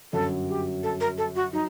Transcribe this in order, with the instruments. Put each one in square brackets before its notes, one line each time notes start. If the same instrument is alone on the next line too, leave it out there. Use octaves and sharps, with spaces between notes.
[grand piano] G1 F#2 F#3 [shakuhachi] A4
[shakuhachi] G4
A4
A#4
A4
F#4
[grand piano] F#3 [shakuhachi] D#4